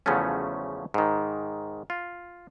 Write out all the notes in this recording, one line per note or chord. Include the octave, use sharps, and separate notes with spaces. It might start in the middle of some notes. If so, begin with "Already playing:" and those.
E2 C#3 F3 F#3 A3 C#4
G#2 D#3
F4